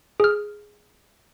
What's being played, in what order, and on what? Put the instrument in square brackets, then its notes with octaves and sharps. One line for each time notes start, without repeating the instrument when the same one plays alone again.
[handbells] G#4 F6